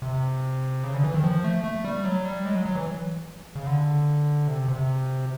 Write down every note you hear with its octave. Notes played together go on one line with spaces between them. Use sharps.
C3
C#3
D3
E3
D#3
F3
A3
A3
G3
F#3
G3
G#3
F#3
F#3
E3
C#3
D3
C3
C3